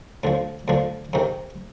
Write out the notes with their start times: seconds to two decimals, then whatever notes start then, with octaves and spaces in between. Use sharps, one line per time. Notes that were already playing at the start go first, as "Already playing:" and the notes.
0.24 D2 D3 F3
0.68 D2 D3 F3
1.13 F2 C3 D#3